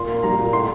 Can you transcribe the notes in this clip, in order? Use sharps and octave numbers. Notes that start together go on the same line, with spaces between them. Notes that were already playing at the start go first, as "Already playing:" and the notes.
Already playing: A#2 C6
A#3
G3 A#5
A#2
A2 C6